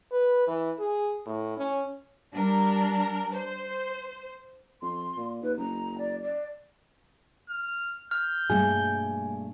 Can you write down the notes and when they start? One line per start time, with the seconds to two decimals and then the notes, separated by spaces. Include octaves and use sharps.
0.12 B4
0.47 E3
0.79 G#4
1.26 A2
1.57 C#4
2.33 G3 D4 A#4
3.34 C5
4.82 F2 C6
5.17 A#2
5.43 D#2 B4
5.58 F#1 A#5
5.98 D5
6.22 D5
7.50 F6
8.11 F6 G6
8.50 G2 B2 A3 A#3 G#4 G#5